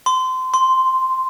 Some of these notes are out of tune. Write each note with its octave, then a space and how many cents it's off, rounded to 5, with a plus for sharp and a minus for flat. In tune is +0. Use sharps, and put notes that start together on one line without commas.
C6 -25
C6 -5